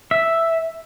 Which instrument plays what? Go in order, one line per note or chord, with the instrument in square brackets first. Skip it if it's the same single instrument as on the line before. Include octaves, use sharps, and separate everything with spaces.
[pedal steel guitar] E5